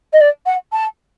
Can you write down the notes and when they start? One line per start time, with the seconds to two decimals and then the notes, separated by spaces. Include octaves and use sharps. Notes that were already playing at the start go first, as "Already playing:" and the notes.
0.13 D#5
0.20 D5
0.46 F#5
0.72 A5